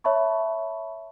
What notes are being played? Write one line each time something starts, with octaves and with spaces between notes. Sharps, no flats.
C#5 E5 A5 B5 C#6